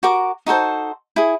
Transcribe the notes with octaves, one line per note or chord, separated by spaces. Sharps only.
F#4 A#4 D6
D#4 F#4 A4 C5
E4 G#4